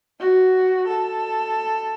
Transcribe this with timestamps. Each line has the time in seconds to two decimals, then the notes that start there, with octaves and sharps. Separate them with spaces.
0.20 F#4
0.88 A4